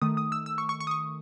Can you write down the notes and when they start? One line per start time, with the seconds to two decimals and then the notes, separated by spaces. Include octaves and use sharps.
0.02 D#3 A3 D#6
0.17 D#6
0.32 E6
0.46 E6
0.58 C#6
0.69 C#6
0.80 C#6
0.87 D#6
0.91 C#6